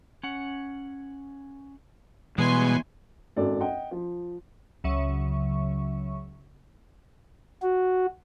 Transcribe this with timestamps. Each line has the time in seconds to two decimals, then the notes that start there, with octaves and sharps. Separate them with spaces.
0.23 C#4 F#5
2.38 B2 E3 G3 G#3 B3 G#5 C6 C#6
3.36 G#1 F#2 F#3 A4 D5
3.60 D#5 F#5 G5
3.91 F3
4.84 C#2 C#3 F#3 E5 C#6
7.62 F#4